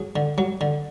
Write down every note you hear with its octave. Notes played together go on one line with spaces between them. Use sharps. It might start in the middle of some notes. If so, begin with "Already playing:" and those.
Already playing: F#3 G#4
D3
F#3
D3